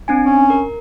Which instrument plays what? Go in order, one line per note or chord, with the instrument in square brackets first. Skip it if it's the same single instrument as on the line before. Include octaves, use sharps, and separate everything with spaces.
[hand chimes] C4 D4 G#5
[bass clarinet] C#4
[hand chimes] A#4